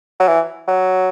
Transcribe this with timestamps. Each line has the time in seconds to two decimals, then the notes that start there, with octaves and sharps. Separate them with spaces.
0.20 F#3
0.28 E3
0.68 F#3